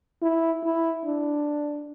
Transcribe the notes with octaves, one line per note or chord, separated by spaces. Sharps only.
E4
E4
D4